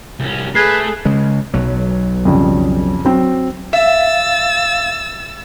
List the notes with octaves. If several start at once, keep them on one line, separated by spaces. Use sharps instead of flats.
C2 C#4
A3 G#4 A4 B4 G#6 C7
C#3 G#3
B1 F#3
F2 C#3 G3
F#3 C4
E5 F5 E6 A6